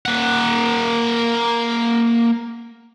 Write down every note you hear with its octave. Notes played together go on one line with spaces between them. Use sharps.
A#3 F#5